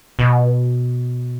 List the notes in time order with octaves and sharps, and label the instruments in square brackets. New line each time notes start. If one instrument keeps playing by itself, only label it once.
[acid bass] B2